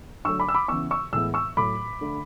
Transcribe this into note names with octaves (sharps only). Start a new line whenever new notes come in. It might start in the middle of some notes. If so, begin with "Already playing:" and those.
D3 F#3 A3 C#6 E6
B5 D6
E6
B5 D6
C#3 E3 B3 C#6 E6
C#6 E6
A2 E3 G#3 B3 E6
C#6 E6
A2 F#3 A3 B5 D6
D3 A3